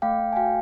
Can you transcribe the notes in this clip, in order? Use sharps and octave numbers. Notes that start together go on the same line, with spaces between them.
A3 F5 G5
A3
G#5
F#4 F5 G5